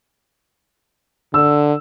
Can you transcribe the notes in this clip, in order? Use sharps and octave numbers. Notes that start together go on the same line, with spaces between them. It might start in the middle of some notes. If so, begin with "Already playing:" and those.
D3 E6